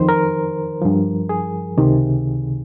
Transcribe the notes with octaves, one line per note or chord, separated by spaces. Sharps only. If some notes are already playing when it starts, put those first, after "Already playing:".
Already playing: F2 D#3 C5
A#4
G2 F3
G#4
C#2 C3 D#3